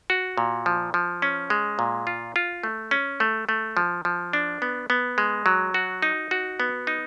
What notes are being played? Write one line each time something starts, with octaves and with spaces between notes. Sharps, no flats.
F#4
A#2
F3
F3
C#4
G#3
A#2
F4
F4
A3
C#4
A3
A3
F3
F3
D4
B3
B3
G#3
F#3
F#4
D#4
F#4
B3
D#4